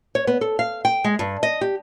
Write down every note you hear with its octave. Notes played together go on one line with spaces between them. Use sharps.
C#5
B3
A4
F5
G5
G#3
G2
D#5
G4